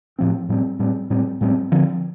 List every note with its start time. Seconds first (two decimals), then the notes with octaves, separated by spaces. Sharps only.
0.19 A2 F3 C4
0.49 A2 G3 C4
0.79 A2 G3 C4
1.10 A2 G3 C4
1.41 A2 G3 C4
1.72 D3 F3 C4